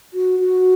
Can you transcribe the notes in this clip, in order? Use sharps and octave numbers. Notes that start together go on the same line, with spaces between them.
F#4
F#4